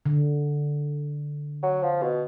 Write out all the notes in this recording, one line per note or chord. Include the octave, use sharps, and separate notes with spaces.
D3
F#3
F3
B2